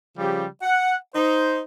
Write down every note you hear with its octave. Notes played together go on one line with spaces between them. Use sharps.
C#3 F3 G3 G4
F#5
D#4 C5